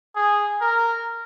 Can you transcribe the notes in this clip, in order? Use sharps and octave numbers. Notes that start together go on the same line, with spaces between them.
G#4
A#4